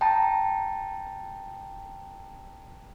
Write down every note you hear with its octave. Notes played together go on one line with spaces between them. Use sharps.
G5 A5 A#5